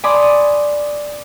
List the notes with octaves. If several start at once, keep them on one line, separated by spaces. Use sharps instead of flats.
D5 G#5 B5 C6 D6 D#6